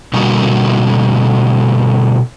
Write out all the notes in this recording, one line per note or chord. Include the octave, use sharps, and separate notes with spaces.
B2 D3 G3 A#3 D#4 F#4